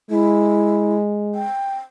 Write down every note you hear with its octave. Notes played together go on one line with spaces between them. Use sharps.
G#3 E4
G5